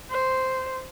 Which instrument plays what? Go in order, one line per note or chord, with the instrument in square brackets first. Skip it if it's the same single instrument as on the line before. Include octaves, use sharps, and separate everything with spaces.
[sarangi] C5